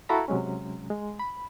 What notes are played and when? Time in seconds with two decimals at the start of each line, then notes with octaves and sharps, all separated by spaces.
0.09 E4 F#4 A4 F5 A#5 B5
0.28 C3 F#3 G#3 C#4
0.90 G#3
1.19 B5